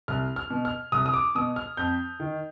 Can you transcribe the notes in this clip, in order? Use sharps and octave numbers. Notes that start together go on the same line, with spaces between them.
C2 F6
F6
B2
F6
C2 D#6
D#6
D6
B2 D#6
F6
F2 G6
D#3